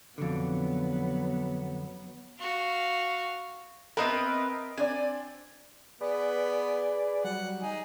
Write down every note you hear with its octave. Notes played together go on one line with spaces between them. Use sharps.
F2 B2 D3 F#3 B3
F#4 F5
B3 C4 A#4 B4 D#5 E5
C4 D4 D5 G#5
B3 G#4 B4 D5
F#3 G3 F#5
D#4 G#4